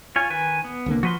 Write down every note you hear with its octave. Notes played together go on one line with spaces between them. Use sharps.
F4 C#5 G#5
D#3 B4 G#5
B3
C2 D3 A#3
F3 F#4 B4 C6